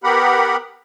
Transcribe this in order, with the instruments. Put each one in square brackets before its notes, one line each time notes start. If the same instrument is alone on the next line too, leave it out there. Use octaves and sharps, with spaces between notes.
[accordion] B3 G4 A#4 F#5 B5